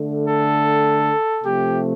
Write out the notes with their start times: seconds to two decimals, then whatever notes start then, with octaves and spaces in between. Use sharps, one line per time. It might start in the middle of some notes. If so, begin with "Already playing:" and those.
Already playing: D3 A3
0.27 A4
1.43 C3 F3 A3 G4